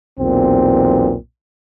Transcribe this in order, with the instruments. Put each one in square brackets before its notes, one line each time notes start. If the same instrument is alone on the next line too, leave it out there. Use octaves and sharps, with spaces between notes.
[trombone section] B1 E2 A#2 C4